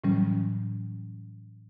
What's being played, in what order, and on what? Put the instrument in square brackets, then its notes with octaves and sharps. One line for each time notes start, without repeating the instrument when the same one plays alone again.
[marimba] A2 C#3 E3 F#3 G3 C#4